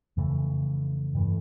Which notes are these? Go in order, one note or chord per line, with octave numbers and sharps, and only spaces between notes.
F2 C#3 E3 A3
G2 E3 A3